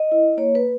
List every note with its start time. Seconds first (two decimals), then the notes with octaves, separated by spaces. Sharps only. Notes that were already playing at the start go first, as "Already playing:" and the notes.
Already playing: D#5
0.12 E4
0.37 A#3 C#5
0.55 B4